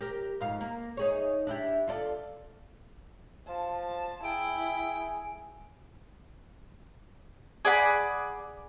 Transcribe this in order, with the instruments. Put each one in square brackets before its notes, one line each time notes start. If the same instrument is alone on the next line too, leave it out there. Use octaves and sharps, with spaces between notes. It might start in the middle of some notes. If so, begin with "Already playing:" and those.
[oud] G4 A#4
F2 G#2 F5
A#3
D#4 G#4 C#5
D4 E4 G4
F4 A4 D5
[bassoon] F3 [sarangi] A5
[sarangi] E4 [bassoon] G#4 [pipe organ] G5
[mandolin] G#4 D5 F#5 B5